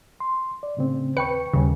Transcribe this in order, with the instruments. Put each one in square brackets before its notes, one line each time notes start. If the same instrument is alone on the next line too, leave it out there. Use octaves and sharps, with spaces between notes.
[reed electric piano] C6
D5
A2 C#3 C4
[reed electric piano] D#2 G5 C#6 [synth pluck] B4 C#7
[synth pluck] D#2 C#3 [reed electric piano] G3